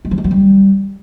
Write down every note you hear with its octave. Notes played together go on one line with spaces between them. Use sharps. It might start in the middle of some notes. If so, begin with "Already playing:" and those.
G#3
F3
G#3
F#3
G3